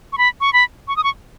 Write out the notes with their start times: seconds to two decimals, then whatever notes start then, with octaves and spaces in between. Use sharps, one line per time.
0.13 C#6
0.18 B5
0.41 C#6
0.53 B5
0.88 C#6
0.97 D#6
1.04 C#6